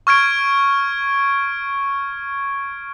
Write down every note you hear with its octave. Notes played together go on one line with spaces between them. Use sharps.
C#6 F6 G#6 D7